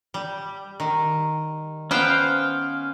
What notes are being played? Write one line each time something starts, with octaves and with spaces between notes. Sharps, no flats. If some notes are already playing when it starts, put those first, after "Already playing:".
G3
D#3
B3 C#4 C5 F5 G5